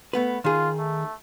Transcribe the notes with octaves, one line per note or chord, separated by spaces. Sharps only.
A3 B3 B4
D#3 F4 G#4
A3